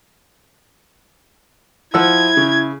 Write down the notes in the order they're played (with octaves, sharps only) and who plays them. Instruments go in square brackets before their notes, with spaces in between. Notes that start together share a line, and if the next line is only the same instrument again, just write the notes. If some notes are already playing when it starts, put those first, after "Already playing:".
[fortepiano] F3 F#5 E6 [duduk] E4 [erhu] G#6
[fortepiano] C#3